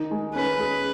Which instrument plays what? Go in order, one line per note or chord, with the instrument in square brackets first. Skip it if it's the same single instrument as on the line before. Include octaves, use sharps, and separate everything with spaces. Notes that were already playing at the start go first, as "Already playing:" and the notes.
Already playing: [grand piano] D#3 D#4
G#3
[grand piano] C#4 [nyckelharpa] B4
[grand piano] G#4